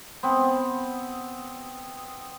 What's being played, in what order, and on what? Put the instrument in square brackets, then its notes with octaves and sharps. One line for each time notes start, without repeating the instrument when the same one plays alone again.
[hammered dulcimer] B3 C4